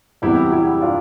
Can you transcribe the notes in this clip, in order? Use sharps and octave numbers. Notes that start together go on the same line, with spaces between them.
E2 C3 G3 B3 E4 G4
E4 G4
D4 F4